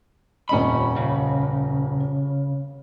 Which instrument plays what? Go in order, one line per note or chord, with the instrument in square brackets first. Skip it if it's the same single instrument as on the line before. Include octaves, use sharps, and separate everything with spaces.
[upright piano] D#1 F2 D#5 [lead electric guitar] C#4 B5
[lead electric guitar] C#3